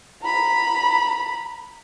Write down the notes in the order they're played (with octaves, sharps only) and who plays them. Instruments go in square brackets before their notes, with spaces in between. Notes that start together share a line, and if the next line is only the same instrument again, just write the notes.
[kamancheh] A#5 B5